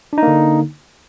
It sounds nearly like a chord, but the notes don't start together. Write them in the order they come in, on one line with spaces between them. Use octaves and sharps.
D4 D#4 A#3 D3